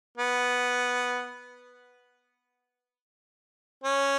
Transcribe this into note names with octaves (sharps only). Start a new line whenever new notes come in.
B3
C#4